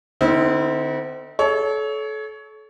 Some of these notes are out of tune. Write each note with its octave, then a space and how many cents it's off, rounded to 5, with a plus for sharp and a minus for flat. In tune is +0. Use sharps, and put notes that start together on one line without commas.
D3 +25 C4 -20 E4 -45
A4 -30 C#5 +20